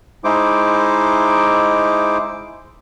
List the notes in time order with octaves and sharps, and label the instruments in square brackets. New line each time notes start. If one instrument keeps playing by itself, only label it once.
[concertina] G#3 D#4 E4 C5 D6